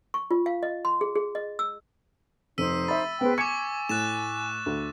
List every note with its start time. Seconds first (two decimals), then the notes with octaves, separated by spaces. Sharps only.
0.14 C#6
0.31 F4
0.46 F5
0.63 D#5
0.85 C6
1.01 G#4
1.15 G#4
1.35 D#5
1.59 E6
2.58 F1 D#4 C5 E6 B6 D#7
2.88 E5 B5 A6
3.21 B3 G#4 B4 C5 G5
3.38 G#5 C#6 D6 G#6 C#7
3.89 A2 F#6 A6 E7
4.66 D2